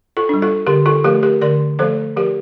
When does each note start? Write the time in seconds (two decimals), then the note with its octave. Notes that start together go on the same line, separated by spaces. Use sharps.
0.17 F4 A4
0.29 G3 D4
0.42 F4 A4
0.67 D3 G4 A#4
0.86 F4 A4
1.04 F3 A3 G4 A#4
1.23 G4 A#4
1.42 D3 A#4 D5
1.79 F3 A3 A4 C5
2.17 F3 G4 A#4